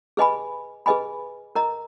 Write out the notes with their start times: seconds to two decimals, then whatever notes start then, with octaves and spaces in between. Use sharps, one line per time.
0.17 G#4 B4 D#5 G#5 B5
0.86 G#4 B4 D#5 G#5 B5
1.55 A#4 D#5 A#5